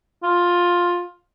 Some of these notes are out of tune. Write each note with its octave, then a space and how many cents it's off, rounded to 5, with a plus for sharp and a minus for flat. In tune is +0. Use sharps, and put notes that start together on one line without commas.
F4 +10